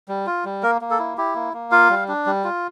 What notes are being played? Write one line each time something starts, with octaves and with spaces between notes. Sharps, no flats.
G3
F4
G3
A#3 A#4
A#3
A4
E4
E4 G4
A#3
A#3
F4 F5
G3
D4
G3
F4